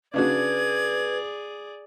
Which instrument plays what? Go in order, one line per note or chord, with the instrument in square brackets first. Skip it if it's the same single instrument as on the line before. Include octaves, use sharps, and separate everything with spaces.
[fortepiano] C#3 D4 F#4 [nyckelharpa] G#4 D5 [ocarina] B4 [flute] G#6